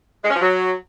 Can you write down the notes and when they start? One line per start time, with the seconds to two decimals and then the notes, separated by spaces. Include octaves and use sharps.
0.23 G#3
0.29 C#4
0.35 F3
0.41 F#3